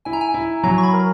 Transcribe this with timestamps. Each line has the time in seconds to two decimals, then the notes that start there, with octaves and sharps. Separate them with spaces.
0.05 E4 G#5
0.13 A#5
0.21 G#5
0.34 E4
0.63 F#3 A#5
0.78 C#6
0.83 B5
0.93 A#4